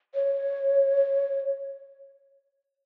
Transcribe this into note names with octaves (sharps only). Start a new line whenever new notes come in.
C#5